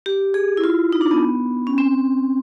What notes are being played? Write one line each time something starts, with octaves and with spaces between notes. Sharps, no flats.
G4
G#4
E4
F4
D#4
D4
B3
C#4
C4